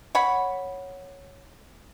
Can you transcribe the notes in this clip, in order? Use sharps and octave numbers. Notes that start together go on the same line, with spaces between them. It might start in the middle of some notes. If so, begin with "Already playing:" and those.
C#5 F#5 B5